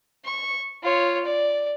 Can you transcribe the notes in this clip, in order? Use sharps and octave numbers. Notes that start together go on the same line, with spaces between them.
C#6
F4 C#5
D5